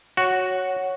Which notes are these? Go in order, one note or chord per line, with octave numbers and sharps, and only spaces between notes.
F#4 C#5 F#5